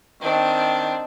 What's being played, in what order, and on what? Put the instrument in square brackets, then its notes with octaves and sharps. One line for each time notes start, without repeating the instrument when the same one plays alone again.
[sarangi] D#3 [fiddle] C4 D4